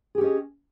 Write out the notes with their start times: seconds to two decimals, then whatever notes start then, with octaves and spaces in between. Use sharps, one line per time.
0.15 G#4
0.18 G4
0.21 C#4
0.24 D#5